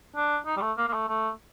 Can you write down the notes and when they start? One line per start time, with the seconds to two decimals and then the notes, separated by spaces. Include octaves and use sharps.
0.16 D4
0.46 D#4
0.57 G3
0.61 A3
0.78 A#3
0.88 A#3
0.93 A3
1.08 A3